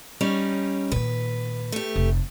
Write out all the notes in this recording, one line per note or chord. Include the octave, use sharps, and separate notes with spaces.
G3 C#4 D#4
A#2 D#3 B4
A3 G4
F1